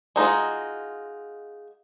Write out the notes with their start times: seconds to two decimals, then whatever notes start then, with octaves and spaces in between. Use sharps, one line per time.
0.16 G#3 D#4 F4 F#4